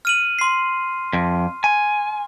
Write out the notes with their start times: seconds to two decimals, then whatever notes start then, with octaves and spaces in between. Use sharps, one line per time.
0.05 F6 D#7 F#7
0.39 C6 C7
1.13 F2
1.64 G#5